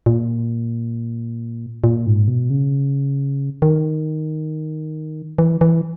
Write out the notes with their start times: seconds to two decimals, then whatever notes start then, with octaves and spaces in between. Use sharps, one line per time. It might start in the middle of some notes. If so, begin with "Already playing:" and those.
0.06 A#2
1.84 A#2
2.07 G#2
2.28 B2
2.50 C#3
3.62 D#3
5.38 E3
5.61 E3